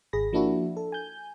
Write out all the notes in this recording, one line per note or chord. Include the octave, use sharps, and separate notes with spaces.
G#1 G#4 B5 A#6
F3 A#3 D4 E4 F#4
A4
G#5 G6